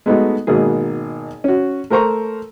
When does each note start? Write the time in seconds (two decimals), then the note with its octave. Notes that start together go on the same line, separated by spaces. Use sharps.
0.06 G#3 A3 B3 D#4 F#4
0.47 G#1 B2 A#3 G#4
1.44 C#4 F#4
1.90 A3 A#4 C5 A#5 C#6